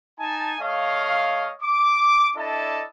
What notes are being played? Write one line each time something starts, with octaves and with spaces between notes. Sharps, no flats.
D#4 G#5 A5
A3 C#5 D#5 F5
D6
D4 E4 A4 D5 D#5 A5